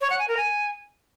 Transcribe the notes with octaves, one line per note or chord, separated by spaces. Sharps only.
C#5
F#5
G#5
A#4
G#5